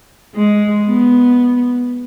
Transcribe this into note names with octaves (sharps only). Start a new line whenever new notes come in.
G#3
B3